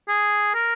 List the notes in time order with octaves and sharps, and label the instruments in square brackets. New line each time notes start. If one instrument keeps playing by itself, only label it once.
[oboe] G#4
A#4